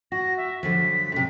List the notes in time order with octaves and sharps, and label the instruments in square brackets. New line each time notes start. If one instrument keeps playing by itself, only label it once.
[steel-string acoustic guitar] F#4 [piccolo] A#6
[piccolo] E5
[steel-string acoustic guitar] D3 F3 F#3 [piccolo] B6
[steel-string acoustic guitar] F#2 C3